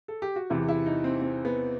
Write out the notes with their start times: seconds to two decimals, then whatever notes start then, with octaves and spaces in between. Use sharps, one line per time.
0.08 A4
0.22 G4
0.36 F#4
0.50 E2 C3 E3 E4
0.68 E4
0.86 D#4
1.04 C4
1.21 C4
1.45 B3